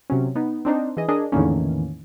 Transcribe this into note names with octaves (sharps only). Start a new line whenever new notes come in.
C3 F#3 C#4
B3 D#4
C4 D4 D#4 C5
E3 G#4 D#5
D4 G#4 A#4 D#5
E2 A2 D3 D#3 A#3 C#4